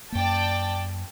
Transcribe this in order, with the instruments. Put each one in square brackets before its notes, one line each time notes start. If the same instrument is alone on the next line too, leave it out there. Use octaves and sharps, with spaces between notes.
[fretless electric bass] F#2 A#3 [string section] D5 G5 A5